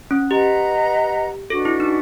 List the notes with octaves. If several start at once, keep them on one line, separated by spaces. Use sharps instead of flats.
C#4
G4 B4 D#5 F#5 A#5
D4 F#4 A4 B4 D#5
E4
D#4